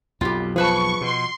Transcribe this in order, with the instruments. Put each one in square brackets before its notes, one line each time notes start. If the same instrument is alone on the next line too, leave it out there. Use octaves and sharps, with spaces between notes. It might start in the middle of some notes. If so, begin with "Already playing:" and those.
[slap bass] B1 F2 [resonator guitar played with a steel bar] F4 G4
[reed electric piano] F3 [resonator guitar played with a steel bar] G#4 B4 A5 [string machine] C#6
[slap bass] B2 [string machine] C6